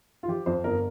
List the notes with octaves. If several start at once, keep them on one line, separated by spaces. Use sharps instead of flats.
F4
F3 G4
F2 C5
G1 A#4